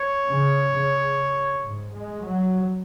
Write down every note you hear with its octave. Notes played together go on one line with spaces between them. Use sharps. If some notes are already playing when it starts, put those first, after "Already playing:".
Already playing: C#5
C#3
C#3
G#2
G#3
F#3